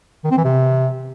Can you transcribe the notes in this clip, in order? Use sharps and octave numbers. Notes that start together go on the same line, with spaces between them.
D#3
C4
E3
C3